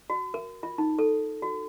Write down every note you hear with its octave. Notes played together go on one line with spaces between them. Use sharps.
F#4
A#4
F4
D#4
A4
F#4